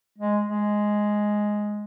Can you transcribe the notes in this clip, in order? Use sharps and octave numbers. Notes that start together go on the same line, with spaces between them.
G#3
G#3